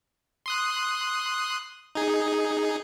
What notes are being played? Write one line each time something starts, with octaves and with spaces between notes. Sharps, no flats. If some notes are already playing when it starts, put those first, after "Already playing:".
C6 D#6 F#6
D#4 G#4